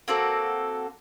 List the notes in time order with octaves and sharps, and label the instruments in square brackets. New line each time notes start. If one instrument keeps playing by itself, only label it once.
[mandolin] A#3 C4 F#4 A4